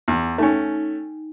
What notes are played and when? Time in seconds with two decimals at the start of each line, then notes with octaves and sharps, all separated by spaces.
0.08 E2
0.38 A3 C#4 D#4 G5 G#5